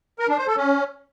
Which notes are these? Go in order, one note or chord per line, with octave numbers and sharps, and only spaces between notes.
A#4
D4
C5
A4
C#4